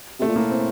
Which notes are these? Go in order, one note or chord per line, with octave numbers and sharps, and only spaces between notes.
C3 A3
A#2
A2 A#3
C4